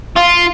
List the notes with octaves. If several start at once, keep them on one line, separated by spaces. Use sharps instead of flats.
F4